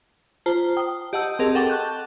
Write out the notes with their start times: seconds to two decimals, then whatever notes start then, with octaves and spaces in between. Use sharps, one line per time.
0.46 F4 C5 A5 A#5
0.77 G5 D#6
1.13 G4 D#5 F#5 A5 E6 G6
1.39 C4 G#4 A#4 D#5 A5
1.55 A4 F#5 G5 C#6 D6 A6
1.70 A5 C#6 F#6 G6